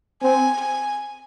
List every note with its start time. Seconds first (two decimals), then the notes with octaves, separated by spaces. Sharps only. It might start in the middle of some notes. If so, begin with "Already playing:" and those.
0.22 C4 G#5
0.60 G#5